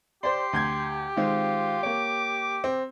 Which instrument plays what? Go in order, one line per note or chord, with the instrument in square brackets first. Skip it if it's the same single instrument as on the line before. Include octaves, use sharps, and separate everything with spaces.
[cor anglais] G4 [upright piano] C5 D5 [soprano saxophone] C6
[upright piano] D2 G6 G#6
[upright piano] D#3 G#3 C4 [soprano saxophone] F4
[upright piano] A#3 C#5 [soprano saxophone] D6
[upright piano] C4